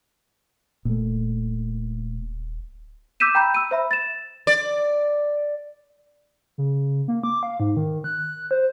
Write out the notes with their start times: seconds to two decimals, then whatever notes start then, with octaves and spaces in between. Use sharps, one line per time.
0.85 D#1 A#2 A3
3.20 D6 E6 G6 B6 D#7 E7
3.35 G5 A#5 B5 G6
3.54 E6 D#7
3.71 C5 E5 B5
3.91 A6 E7
4.47 D5
6.58 C#3
7.08 A#3
7.23 D6
7.43 F5
7.60 G#2
7.77 D#3
8.04 F#6
8.51 C5